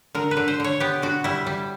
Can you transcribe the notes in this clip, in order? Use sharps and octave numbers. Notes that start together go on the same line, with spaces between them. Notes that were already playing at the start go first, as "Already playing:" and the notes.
D3 A#4
B4
D3
C5
D3 C#5
B3 G4
D3 F#4
G3 E4
G3